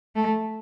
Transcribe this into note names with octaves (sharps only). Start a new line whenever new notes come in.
A3